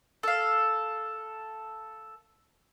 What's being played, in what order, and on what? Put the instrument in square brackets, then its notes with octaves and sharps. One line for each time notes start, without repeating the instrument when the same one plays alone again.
[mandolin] A4 F5